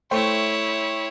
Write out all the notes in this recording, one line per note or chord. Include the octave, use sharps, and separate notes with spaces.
A3 E4 C5 C#5 G5